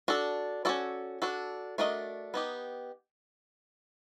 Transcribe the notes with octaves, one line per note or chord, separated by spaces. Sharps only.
D4 F#4 A4
C#4 F#4 A4 D5
D4 F#4 A4
A3 D4 F#4 A#4 D#5
B3 D#4 G4